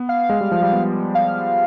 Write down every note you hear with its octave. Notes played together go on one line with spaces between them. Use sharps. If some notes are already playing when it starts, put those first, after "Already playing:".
Already playing: B3
F5
G#3
G3
F3
G3
B3
F5